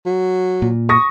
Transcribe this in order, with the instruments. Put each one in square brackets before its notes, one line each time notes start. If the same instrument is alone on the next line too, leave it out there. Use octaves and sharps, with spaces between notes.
[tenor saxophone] F#3
[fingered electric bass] A#2
[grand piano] C#6 D#6 A#6